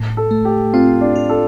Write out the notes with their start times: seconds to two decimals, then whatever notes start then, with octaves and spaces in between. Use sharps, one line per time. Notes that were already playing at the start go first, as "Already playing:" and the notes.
Already playing: A2
0.17 A4
0.31 A3
0.45 G4
0.74 C4 F4
1.01 D4
1.16 F4
1.29 A4